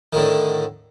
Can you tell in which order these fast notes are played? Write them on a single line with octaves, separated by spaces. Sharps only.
D#3 A2 D3